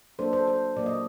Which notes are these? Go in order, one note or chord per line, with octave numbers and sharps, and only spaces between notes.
F#3 A#3 D4 A4 C5
A4 C5
A4 C5
A#2 F#3 A#3 D5
D#5